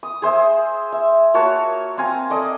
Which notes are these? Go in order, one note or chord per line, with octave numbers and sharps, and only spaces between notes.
D#6
G#4 C5 E5
E5
A#3 F#4 C#5 A5
C4 F5 G#5 A#5
A4 D5 D#5